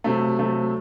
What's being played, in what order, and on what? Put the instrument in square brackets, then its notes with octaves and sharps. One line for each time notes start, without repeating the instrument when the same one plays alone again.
[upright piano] C3 F#3 A3
C3 F#3 A3